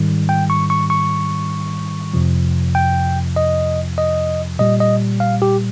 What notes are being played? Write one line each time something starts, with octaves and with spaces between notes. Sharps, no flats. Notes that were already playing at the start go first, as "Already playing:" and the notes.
Already playing: G#2 D#3 G3
G5
C#6
C#6
C#6
F2 C3 F3
G5
D#5
D#5
A#2 G3 D#5
D#5
F5
G4